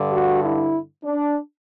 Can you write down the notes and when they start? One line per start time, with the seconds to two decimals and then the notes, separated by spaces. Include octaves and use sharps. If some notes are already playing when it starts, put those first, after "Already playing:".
Already playing: G2 D3
0.12 F#4
0.43 E4
1.04 D4